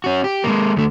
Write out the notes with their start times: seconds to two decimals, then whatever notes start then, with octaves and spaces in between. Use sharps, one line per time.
0.04 C#4 F#4
0.24 G4
0.44 G#3 A#3
0.76 D2 A3